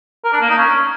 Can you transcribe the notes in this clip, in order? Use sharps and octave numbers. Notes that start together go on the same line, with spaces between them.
A#4
D4
A#3
D#4
C#4